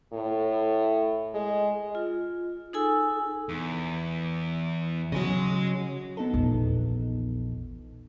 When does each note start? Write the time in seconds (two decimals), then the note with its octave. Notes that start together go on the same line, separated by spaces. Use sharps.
0.13 A2
1.34 G#3
1.95 F4
2.73 D#4 G#4 A4 G#5 E6
3.49 E2
5.12 C#3 F#3 D#5 G#5
6.17 B3 D#4 A4
6.34 A#1 E2